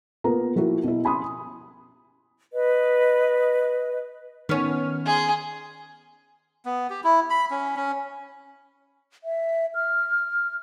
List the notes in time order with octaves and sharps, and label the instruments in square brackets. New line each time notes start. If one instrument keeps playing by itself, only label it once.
[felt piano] A#3 B3 F4 A#5
F3 A#3 E4 F#4 G4
B2 E4
G#5 B5 C6 D#6
[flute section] B4 D#5
[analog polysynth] D#3 F6 [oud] B3 C#4
[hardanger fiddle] G#4 C6
[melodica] B3
G4
E4
B5
C#4
C#4
[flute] E5
F6